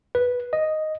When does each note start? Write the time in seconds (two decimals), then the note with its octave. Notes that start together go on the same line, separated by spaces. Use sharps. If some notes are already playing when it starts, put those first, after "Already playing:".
0.15 B4
0.53 D#5